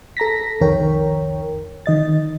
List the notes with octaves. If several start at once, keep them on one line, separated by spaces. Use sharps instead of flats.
A4 A#5 A#6 B6
C2 F2 D#3 A#4 C#5 G5
D#3 D#5 A6